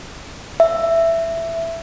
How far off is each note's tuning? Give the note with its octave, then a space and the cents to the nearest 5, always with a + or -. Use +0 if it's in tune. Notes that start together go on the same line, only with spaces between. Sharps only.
E5 +10